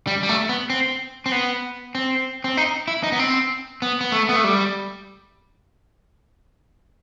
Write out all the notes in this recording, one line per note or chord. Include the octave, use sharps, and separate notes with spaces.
G3
G3
A3
B3
C4
C4
B3
C4
C4
D#4
E4
D#4
B3
C4
B3
B3
A3
B3
A3
G3